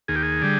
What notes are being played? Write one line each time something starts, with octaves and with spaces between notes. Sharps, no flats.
D#2 G#4
G4
G#4
D3 G3